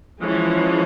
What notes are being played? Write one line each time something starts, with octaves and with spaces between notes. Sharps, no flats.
E3 F3 G#3 C#4